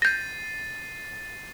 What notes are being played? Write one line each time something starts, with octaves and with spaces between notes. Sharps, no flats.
G6 A6 A#6 C7 D#7